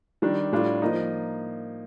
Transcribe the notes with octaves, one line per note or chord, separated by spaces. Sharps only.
D#3 G3 D4
A2 G3 D4 F4
F3 A#3 D#4